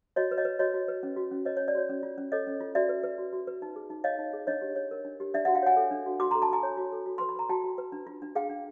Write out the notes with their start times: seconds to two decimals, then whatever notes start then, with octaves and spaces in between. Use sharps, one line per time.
0.16 F#4 C#5 D#5
0.31 B4
0.38 C#5 D#5
0.45 B4
0.59 F#4 C#5 D#5
0.74 F#4
0.88 B4
1.03 C#4
1.17 F#4
1.32 C#4
1.45 B4 C#5 D#5
1.57 C#5
1.61 C#4
1.68 D5
1.75 F#4 C#5
1.89 C#4
2.03 F4
2.18 C#4
2.32 A4 C#5 D#5
2.47 C#4
2.61 F4
2.75 F#4 D5 E5
2.89 B4
3.03 B4
3.18 F#4
3.33 F#4
3.47 B4
3.62 D#4
3.76 G#4
3.90 D#4
4.04 C#5 D#5 F5
4.19 D#4
4.33 G#4
4.47 D4 C#5 D#5
4.62 G4
4.76 C#5
4.91 A#4
5.05 D4
5.20 G4
5.34 D4 D5 E5
5.45 E5 F#5
5.48 F#4
5.55 F5 G5
5.62 C#5 F#5 G#5
5.77 A4
5.91 D4
6.06 F#4
6.20 F#4 C6 D6
6.31 A#5 C6
6.35 A4
6.42 A5 B5
6.49 F#4 G#5 A#5
6.63 C#5
6.77 F#4
6.92 A4
7.06 F#4
7.18 B4 C6
7.29 B5
7.36 B4 A#5
7.49 F#4 G5 A5
7.64 F#4
7.78 B4
7.92 D4
8.07 F4
8.22 D4
8.35 G#4 F5 G5
8.50 D4